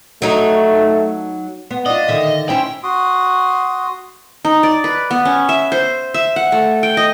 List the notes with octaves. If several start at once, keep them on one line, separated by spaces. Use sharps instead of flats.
F#3 A3 D#4
B3
D4 F4 D#5
D3 D#3 E5
C#4 E4 C5 G5
F#4 C6 D#6
D#4
D5
B4
B3
C#4
E5
C5
E5
F#5
A3
G5
D#5